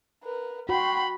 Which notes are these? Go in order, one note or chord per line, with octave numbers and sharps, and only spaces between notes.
A#4 B4
F#4 G5 B5 C6